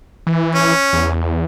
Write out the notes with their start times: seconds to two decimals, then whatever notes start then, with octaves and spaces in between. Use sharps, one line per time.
0.27 E3
0.55 C#4
0.93 E2